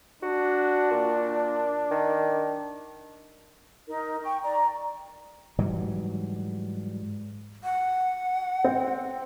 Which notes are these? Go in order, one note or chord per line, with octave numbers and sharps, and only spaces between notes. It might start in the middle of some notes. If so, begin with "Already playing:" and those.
D4 F#4
A#2
D#3
D#4 A#4
G5 C#6
D5 A#5
G#2 E3 F#3 G3
F#5
C4